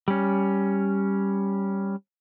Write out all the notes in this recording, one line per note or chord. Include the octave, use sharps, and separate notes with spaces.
G3 C#4